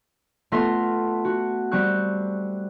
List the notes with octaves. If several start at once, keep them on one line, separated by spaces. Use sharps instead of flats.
A3 B3 F4 E5 C6 A#6
F#4
G3 C4 C#6 F#6